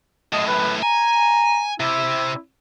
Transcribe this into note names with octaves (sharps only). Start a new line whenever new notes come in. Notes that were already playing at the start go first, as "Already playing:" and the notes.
F#2 A2 D#5
B4
G#5 A#5
C3 E4